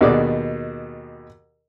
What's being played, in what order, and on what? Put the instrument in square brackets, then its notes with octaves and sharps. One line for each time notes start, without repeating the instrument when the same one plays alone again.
[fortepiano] D#2 B2 G#4 D5